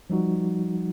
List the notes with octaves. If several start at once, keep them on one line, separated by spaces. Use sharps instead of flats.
F3 G3 D#4 F#4